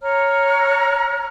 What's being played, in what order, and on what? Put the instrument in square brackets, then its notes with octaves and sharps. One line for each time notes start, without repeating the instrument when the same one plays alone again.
[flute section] C#5 A#5 F6